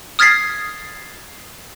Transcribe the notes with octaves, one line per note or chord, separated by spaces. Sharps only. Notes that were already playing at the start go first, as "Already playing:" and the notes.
D#6 F6 G#6 A6 B6 C7